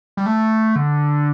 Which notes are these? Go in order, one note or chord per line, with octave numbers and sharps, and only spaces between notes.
G3
A3
D3